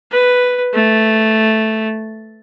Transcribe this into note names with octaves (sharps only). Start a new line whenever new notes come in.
B4
A3